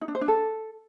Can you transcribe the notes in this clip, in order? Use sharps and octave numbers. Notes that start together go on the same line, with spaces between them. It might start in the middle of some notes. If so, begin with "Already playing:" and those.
D#4
D4
C5
D4
A4